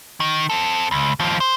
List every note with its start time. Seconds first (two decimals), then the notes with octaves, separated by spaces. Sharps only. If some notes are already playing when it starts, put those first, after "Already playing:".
0.20 D#3
0.50 C4 A4
0.91 C#2
1.20 D#2 F3
1.40 C5